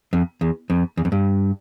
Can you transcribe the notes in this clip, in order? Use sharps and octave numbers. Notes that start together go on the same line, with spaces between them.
F2
E2
F2
E2
F2
G2